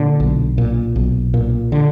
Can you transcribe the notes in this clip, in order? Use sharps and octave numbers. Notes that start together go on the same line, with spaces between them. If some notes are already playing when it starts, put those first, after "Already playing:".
Already playing: A#2 D3
B1
A#2
B1
A#2
D3